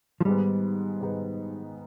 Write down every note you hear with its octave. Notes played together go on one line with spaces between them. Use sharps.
F3
G#2 D#3 G3 G#3 B3 D#4
G#2 D#3 G#3 B3 D#4